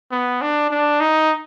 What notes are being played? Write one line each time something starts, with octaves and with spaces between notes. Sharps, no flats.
B3
D4
D4
D#4